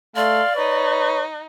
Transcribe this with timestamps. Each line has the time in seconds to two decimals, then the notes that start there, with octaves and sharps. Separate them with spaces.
0.16 A3 D5 F5 C6
0.56 D#4 B4 C#5